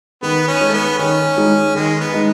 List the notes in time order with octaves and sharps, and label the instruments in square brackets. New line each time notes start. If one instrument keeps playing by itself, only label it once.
[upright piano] D#3 [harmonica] B3
[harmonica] C#4
[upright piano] G#3 D#4
[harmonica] A3
B3
[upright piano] D#3 [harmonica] C#4
[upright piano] G#3 D#4
[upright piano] D#3 [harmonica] G#3
[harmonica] B3
[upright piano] G#3 D#4